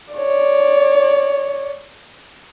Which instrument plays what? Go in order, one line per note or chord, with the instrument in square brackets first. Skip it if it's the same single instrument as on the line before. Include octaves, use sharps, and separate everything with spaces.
[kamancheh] C#5 D5